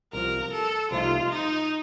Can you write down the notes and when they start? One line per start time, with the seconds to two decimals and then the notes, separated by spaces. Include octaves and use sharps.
0.13 C2 C3 F3 A#4
0.52 A4
0.91 C2 C3 F3 A3 D#4 F4
1.30 D#4